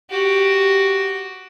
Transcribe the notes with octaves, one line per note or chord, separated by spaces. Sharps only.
F#4 G4